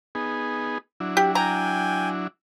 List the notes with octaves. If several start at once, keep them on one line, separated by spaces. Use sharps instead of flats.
B3 D#4 G#4
F#3 D4 E4
G4
G5 G#5 A#5